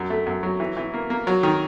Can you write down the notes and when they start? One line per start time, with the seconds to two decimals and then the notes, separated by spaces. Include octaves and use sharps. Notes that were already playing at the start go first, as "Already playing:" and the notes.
Already playing: F#2
0.10 A3
0.26 F#2
0.43 F#3
0.60 E3
0.77 E3
0.94 A#3
1.10 A#3
1.27 F#3
1.43 D#3